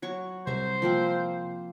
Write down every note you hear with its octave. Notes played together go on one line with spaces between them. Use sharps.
F#3 C#5 C#6
C2 C5 E5 A#5
F3 A#3 C4